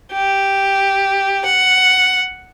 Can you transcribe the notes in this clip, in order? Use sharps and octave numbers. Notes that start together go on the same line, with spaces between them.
G4
F#5